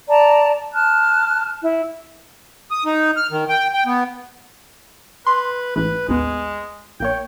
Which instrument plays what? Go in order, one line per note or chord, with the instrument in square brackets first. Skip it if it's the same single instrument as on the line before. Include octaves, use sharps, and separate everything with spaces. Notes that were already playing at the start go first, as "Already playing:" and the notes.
[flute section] D5 A5 A#5
A5 F6 F#6
E4
[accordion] D#6
D#4
F6
D#3
G5
G5
B3
[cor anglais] B4 [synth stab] C6
[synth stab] A1 G#2 E3 [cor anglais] B4
[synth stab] A1 D#2 B3 [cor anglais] G#3
[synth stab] A#1 A#3 C#5 [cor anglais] G5